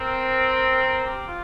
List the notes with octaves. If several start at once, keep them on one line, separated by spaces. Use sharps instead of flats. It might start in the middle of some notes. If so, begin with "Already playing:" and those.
Already playing: C4 A#4
A#4
G4
F4